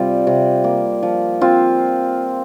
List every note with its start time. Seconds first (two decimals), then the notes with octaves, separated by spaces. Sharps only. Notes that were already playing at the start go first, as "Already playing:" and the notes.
Already playing: C3 G3 F4
0.27 C3
0.64 A#3
1.03 F3
1.41 C4 F4